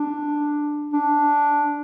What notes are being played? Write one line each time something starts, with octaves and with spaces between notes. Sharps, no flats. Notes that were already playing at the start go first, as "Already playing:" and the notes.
Already playing: D4
D4